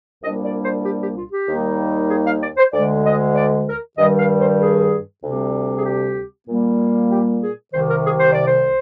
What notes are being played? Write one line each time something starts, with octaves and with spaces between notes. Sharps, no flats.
C2 A#2 G3 A#3 D4 D#5
D5
C5
G4
G4
F4
G4
D#2 D#3 G3 A#3 D#4
G#4
F5
D5
C5
D2 D3 G#3 D5
D#5
D5
A#4
G2 D#3 G3 D#5
F5
C5
G#4
D2 C3 G3 C4
G#4
G4
A#2 G3 A#3
G4
G#4
C2 C3 D#3 C5
A#4
G#4
C5
D5
C5